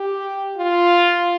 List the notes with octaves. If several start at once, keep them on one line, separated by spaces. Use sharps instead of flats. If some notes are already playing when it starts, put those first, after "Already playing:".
Already playing: G4
F4